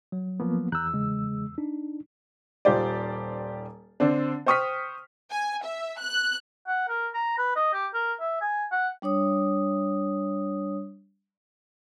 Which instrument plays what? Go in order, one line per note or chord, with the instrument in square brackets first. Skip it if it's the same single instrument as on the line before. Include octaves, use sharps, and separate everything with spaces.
[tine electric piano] F#3
[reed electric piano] F3 A#3 B3
[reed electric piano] E2 E6 [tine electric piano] A#5 F#6 G6
[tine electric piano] C#3 G#3
D4 D#4
[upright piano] D#1 F4 G4 C5 D5
D3 C4 D4
C5 G5 C#6 D#6 F6 B6
[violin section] G#5
E5
F#6
[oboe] F#5
A#4
A#5
B4
D#5
G4
A#4
E5
G#5
F#5
[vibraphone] G3 D4 C#5 D#6